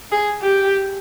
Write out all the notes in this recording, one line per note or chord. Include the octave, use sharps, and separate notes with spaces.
G#4
G4